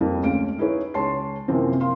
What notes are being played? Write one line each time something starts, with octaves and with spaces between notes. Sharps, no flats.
F2 G3 A#3
D2 G#3 C#4 F5 D7
D#4 E4 G#4 B4 C#5
C#2 C#5 A5 C6 C7
F#2 C3 E3 F3 A#3 C4
A#4 F5 C6